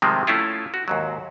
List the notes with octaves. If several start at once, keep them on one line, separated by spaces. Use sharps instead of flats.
C3 D#3 F3 G3 G#3 C4
A3 C#4 E4 F4
F#4
D#2 G#2 F#3